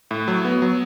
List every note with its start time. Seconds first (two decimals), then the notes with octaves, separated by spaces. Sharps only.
0.11 A2
0.28 F#3
0.45 B3
0.62 F#3